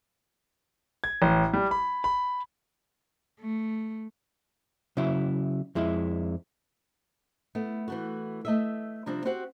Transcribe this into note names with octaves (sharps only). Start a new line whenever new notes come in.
G#6
A1
G3
B5
B5
A3
C#3 F#3 E4
F2 G#3 E4
A3 B3 E4
E3 A3 F#4
A3 D#5 E5
C3 F3 G3 C4 D4
C4 F#4 G4 C5 F#5